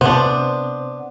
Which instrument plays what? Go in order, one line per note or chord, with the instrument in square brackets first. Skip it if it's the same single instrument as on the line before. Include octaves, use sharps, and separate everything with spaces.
[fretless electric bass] C3 [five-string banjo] B3 D4 [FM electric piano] C5